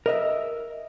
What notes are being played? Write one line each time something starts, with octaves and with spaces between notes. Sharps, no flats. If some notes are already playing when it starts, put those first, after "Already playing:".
A#4 D#5 E5